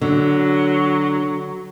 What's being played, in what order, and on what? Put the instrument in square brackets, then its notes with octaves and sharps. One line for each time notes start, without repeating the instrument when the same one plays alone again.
[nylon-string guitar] D3 [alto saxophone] F#3